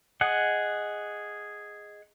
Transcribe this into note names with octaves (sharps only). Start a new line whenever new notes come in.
G#4 D#5 F#5